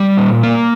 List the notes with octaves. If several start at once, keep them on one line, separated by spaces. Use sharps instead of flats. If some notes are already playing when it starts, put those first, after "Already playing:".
Already playing: G3
A#2
A#3